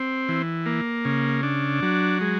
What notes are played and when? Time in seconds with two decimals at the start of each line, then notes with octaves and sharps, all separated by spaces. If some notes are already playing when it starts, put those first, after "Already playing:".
Already playing: C4
0.29 E3
0.66 A#3
1.05 C#3
1.43 D4
1.82 F#3
2.21 G#3